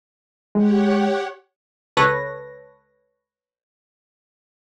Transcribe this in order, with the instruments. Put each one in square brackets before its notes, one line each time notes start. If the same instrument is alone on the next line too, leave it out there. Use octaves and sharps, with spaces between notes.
[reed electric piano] G#3 [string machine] G4 C#5 F#5
[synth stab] C#2 A4 B4 C#5 A#6